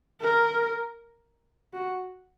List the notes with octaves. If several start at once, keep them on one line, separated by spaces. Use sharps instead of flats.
A#4
F#4